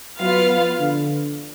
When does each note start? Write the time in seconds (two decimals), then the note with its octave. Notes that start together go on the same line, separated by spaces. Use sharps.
0.19 F#3 B3 F4 B4 F5
0.49 F3
0.79 D3